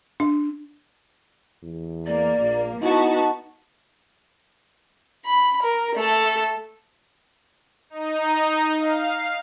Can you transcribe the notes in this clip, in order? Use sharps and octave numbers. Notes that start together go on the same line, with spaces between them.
D4
E2
A#3 D5
A#1
B3 D#4 E4 F#4 A5
B5
A#4
A3 A4
D#4
F5